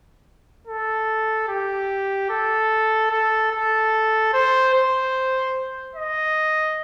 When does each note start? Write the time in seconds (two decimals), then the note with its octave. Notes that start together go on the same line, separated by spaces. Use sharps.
0.67 A4
1.48 G4
2.30 A4
3.11 A4
3.51 A4
4.33 C5
4.73 C5
5.95 D#5